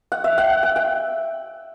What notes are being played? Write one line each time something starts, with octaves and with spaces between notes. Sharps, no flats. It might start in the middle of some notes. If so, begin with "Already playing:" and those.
F#5
E5
F#5
G5
G5